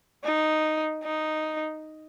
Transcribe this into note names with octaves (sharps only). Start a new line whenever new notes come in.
D#4
D#4